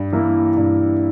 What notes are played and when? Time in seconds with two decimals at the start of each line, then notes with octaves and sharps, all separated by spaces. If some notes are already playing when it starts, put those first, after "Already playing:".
Already playing: G2
0.13 E3 A#3 E4
0.57 G2